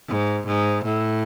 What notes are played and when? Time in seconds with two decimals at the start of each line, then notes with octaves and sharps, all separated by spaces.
0.09 G#2
0.47 G#2
0.85 A2